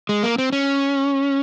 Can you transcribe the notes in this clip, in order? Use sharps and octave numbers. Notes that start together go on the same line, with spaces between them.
G#3
A#3
C4
C#4